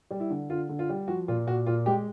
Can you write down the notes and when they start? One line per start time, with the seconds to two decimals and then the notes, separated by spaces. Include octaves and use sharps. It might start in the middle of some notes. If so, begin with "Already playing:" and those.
0.11 G3
0.20 E4
0.30 D3
0.50 D3 F4
0.69 D3
0.79 F4
0.89 G3
1.08 F3 F#4
1.28 A#2 F4
1.47 A#2 F#4
1.66 A#2 F4
1.86 G#3 G4